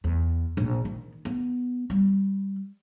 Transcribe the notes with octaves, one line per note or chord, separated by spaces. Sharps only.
E2
A#1
D#3
B3
G3